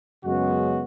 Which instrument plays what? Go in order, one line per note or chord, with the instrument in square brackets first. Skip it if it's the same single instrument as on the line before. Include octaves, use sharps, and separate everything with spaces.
[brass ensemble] F#2 C#3 G#3 B3 F#4